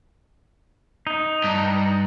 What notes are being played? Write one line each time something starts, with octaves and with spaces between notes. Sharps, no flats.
D#4
G2